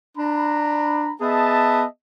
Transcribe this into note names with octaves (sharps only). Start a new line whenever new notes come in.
D4 A#5 B5
B3 G#4 D#5 E5 A5